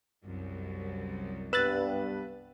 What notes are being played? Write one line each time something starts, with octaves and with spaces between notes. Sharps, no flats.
C2 F#2
G2 G3 B3 B4 E6 F#6 A6